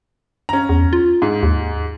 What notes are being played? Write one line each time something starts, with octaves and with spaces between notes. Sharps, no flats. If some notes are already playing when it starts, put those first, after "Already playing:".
C#4 A#5
E2
F4
G#2
D#2